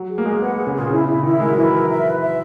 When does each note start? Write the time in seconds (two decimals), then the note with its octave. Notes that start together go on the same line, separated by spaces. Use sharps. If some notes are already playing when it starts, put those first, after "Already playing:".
Already playing: F#3
0.10 G#4
0.18 A#3
0.25 G#3 G#4
0.32 A#3
0.41 B3 F#5
0.54 A#3
0.58 G#4
0.67 C#3
0.74 A#2 G#4
0.90 C#3 E4
1.07 C#3 E4
1.23 D#3 E4
1.40 G#3 A#4
1.49 F#3
1.56 E3 E4
1.66 F#3
1.72 A#4
1.89 E5
2.06 B4
2.22 E5